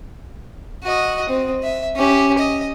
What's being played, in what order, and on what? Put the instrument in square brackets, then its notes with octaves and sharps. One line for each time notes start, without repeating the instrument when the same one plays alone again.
[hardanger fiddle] F#4 D#5
C4
E5
C#4 G4
D#5